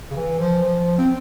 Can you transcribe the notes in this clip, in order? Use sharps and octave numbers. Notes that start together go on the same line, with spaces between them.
C#3
E3
F3
F3
F3
C4